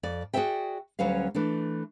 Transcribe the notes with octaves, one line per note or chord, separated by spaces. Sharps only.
F2 D5
F#4 G#4 C#5 D5 E5 G5
D2 F#3 G3 C#4 B4 F5
E3 A3 D4